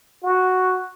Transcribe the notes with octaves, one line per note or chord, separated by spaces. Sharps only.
F#4